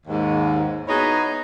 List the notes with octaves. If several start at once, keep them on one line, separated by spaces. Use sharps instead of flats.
D#2 G#2
B3 D#4 E4 F#4 G#4 C#5